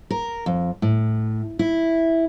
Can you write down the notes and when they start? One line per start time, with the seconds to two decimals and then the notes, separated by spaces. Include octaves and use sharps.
0.10 A#4
0.46 F2
0.82 A2
1.59 E4